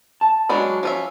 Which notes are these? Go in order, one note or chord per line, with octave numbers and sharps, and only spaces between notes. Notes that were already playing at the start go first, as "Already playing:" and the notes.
A5
G#3 C#4 D4 F#4 C#5 B5
F3 C#4 E5